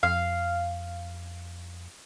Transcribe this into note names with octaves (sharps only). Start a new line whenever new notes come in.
F2 F5